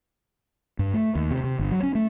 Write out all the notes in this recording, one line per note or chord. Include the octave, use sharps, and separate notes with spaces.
G2
A3
D#2
C3
C3
G1
F#3
C#4
A3